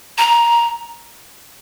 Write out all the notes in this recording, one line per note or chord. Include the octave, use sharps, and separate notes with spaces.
A#5